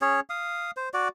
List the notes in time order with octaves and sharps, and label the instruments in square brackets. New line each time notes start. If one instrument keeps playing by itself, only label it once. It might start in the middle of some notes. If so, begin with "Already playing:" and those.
[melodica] C#4 G#4 C#5
F5 D#6
C5
F#4 D5